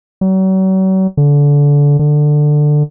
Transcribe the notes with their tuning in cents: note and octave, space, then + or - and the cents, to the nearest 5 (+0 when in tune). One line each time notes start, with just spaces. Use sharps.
F#3 +40
D3 -25
D3 +15